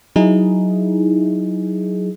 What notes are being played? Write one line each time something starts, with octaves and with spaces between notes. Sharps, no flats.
F#3 D#4 E4 G#4